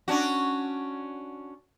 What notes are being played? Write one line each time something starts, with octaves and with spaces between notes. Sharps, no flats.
C#4 D4 F#4